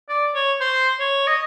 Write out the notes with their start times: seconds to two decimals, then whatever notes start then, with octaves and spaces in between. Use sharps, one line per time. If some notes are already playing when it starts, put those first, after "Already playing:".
0.09 D5
0.34 C#5
0.61 C5
0.99 C#5
1.27 D#5